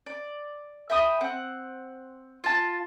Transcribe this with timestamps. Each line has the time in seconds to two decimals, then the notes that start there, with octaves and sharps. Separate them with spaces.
0.06 D5
0.90 E5 G5 B5 D#6
1.21 C4 F#5
2.44 F4 A5